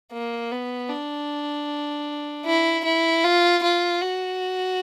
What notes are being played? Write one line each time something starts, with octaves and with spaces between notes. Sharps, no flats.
A#3
B3
D4
E4
E4
F4
F4
F#4